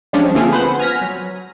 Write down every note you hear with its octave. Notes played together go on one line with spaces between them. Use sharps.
F3 G3 G#3 C#4 D4
D3 A3 A#3 C4 F4 G#4
B3 B4 C5 F#5
G#5 F6 A#6 B6
F#3